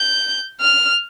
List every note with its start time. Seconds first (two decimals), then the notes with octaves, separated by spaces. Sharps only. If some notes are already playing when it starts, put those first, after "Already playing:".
Already playing: G6
0.61 F6